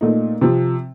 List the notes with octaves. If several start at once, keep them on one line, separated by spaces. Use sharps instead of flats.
A#2 A3 D#4
C3 F3 C4